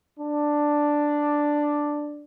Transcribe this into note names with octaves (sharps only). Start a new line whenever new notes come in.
D4